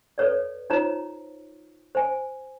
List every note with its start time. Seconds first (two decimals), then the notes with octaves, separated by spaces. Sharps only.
0.18 A4 B4 C#5 D5
0.70 D#4 F4 C5 C#5 A#5
1.95 C5 G#5